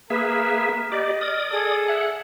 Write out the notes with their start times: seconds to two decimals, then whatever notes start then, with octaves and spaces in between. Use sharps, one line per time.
0.10 A#3 G#4 A#4 B4 E5
0.92 G4 D5 D#5
1.21 D5 D#6 F6
1.52 G#4 A4
1.88 E5 F#5